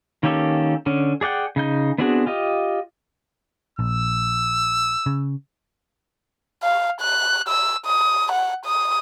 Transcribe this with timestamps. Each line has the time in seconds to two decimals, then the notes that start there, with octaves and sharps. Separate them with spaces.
0.23 D#3 A#3 C#4 G4 A4
0.86 D3 C#4
1.21 G#4 D5 F#5 G5
1.56 C#3 D#4 G6
1.98 B3 C4 D4 F#4 G#4
2.26 F4 G4 D#5
3.79 A#1 E6
5.06 C#3
6.63 F5
7.01 F#6
7.49 E6
7.86 D#6
8.32 F#5
8.65 D#6